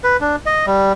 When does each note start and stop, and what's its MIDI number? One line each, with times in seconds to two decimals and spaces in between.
0.04 0.17 71
0.21 0.36 62
0.46 0.66 75
0.66 0.93 55